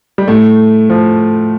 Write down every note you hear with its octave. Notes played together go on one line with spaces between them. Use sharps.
G3
A2 A3
F3